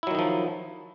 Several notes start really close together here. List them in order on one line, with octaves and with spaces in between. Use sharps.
E4 F#3 D#3 D#4 F3